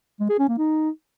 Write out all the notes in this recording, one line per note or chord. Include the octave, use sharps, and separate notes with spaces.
G#3
G#4
C#4
A#3
D#4